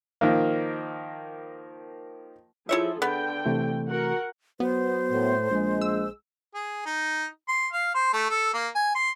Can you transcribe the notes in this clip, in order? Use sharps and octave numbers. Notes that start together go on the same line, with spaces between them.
D#3 F3 A#3
F3 E4 G#4 A4 C#5 E5
D3 B3 G5
C3 E3 A3
F#4 A#4 F#5
F#3 B3 C5
A2
A#1 G#3
E6
G#4
D#4
C6
F5
C5
A3
A4
A#3
G#5
C6